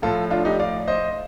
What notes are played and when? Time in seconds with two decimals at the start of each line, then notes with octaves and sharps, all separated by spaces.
0.02 A2 F3 F4 A4
0.30 D4 F4
0.45 D#4 G4
0.60 D5 F5
0.87 C5 D#5